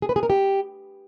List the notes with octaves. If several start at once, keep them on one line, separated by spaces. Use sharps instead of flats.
G#4
B4
G#4
A#4
G4